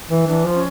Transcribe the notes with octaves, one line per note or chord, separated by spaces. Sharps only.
E3
E3 D4
F3
C#4